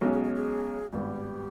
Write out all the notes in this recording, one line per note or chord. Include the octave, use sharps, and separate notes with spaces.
B1 B2 G#3 C#4 G#4
G#4
G#4
G#4
G#1 G2 G3 B3 G4